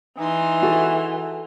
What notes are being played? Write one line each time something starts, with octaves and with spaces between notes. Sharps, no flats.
E3 D#4 C6
F#4 G#4 A4